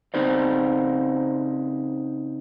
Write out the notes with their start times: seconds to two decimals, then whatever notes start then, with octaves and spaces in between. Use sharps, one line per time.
0.14 C#3 C4 D#4 C5 D5